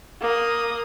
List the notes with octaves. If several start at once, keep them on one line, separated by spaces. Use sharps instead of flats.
A#3 D#6